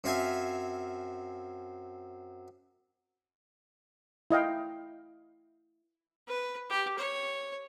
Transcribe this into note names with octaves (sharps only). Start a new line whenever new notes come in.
F#2 C4 E5 F5 G#5
E4 D#5 F5 G5
B4
G4
C#5